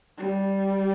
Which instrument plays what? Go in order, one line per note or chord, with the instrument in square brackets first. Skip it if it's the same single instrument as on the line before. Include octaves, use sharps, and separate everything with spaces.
[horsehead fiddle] G3